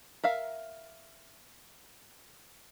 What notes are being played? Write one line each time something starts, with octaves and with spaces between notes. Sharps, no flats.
A#4 E5 F5